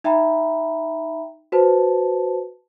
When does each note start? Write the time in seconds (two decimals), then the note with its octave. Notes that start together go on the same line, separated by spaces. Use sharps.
0.04 D#4 E5 G5 A#5 B5
1.52 F#4 B4 C5 A5